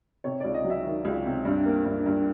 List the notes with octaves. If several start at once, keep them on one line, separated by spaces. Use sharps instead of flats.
C3 C#5
C#2 D5
D#5
F#3
E5
D#3
C#2
C3
G2
A#3
G2
G2